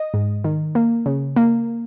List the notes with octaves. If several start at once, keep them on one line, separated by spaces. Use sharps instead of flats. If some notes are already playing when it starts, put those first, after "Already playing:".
Already playing: D#5
G#2
D#3
A#3
C#3
A#3